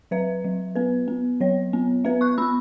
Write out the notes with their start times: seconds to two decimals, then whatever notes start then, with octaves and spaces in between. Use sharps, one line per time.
0.11 F#3 B4 E5
0.44 F#3
0.75 B3 B4
1.08 B3
1.40 F#3 C#5
1.73 B3
2.04 B3 B4 E5
2.21 C#6 F#6
2.38 B3 B5 E6